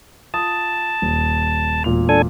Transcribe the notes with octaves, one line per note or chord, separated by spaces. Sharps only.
F4 A5 D#6
D#1
E1 A#2 F7
D4 A4 G#5